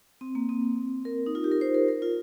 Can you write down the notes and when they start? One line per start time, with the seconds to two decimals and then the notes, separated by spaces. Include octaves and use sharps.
0.21 C4
0.35 A#3
0.49 C4
1.05 A#4
1.26 D#4
1.35 F4
1.44 G4
1.52 A#4
1.61 C5
1.74 A#4
1.88 A#4
2.02 F4